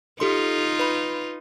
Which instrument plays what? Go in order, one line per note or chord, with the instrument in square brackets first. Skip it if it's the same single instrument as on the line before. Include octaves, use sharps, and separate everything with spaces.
[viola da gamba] D#4 F4 [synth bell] G4 A4 C6
[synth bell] B4 B5